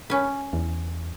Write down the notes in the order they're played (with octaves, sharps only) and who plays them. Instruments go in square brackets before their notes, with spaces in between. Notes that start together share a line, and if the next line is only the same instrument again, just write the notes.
[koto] C#4 B4
[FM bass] E2